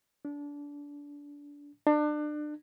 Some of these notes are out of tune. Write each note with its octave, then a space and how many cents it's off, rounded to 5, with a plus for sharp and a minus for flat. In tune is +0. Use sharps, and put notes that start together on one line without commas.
D4 -25
D4 +30